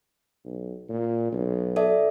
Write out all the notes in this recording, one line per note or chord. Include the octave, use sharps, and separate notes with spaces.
B1
A#2
B1
A4 D5 E5